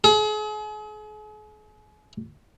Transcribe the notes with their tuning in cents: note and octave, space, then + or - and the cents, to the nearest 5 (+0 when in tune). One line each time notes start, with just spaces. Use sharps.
G#4 +40